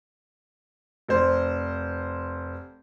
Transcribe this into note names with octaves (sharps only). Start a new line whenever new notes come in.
F1 C5